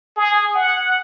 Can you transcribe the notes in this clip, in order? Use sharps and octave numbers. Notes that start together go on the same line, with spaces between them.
G#4
F#5